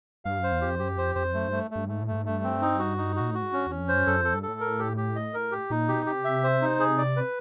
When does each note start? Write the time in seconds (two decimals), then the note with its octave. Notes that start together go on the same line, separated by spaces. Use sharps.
0.25 G2 F5
0.39 F#2 C5
0.52 E2
0.61 F2 G4
0.79 F#2 G4
0.97 F2 C5
1.15 F2 C5
1.34 F#2 A3
1.48 G2 A3
1.71 G2 A3
1.88 G#2 A3
2.02 A2
2.07 G2 A3
2.15 G#2
2.26 G2 A3
2.44 C4
2.62 D#4
2.79 F#4
2.98 D#4
3.16 A#2 F#4
3.31 A2 F#4
3.42 G#2
3.52 G2 C#4
3.66 E2 C#4
3.79 F2
3.88 F#2 C5
4.06 F#2 A4
4.21 F2 A4
4.34 G2
4.43 A4
4.48 A2
4.61 A#4
4.79 G4
4.97 G4
5.15 D#5
5.34 A#4
5.52 G4
5.70 A#2 D#4
5.88 B2 G4
6.06 C3 G4
6.24 E5
6.44 C5
6.62 D#4
6.80 G#4
6.98 D5
7.16 B4